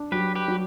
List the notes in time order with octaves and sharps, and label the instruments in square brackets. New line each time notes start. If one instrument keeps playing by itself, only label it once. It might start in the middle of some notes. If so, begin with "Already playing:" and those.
Already playing: [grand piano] D4
[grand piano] F#3 [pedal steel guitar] G4 B4
[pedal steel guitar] G4 B4
[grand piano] F#3